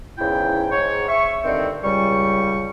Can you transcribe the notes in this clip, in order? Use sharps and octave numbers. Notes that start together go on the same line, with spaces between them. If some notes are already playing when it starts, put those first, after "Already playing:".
E2 G#2 C#3 E4 G5
G#2 C#5
E5 C#6
G2 D3 D#3 C4
C#2 G3 C#6